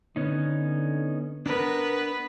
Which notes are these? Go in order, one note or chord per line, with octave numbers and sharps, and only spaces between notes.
D3 B3 C#4 D#4
B3 D4 A#4 B4